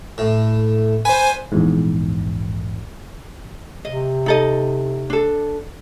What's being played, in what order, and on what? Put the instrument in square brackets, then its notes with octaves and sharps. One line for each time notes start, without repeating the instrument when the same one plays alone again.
[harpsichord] A2
[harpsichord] B4 [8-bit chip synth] C5 G#5
[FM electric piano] A#1 E2 G#2
[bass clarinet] C3 [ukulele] D#5
[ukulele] D#4 A4 D#5
D4 A4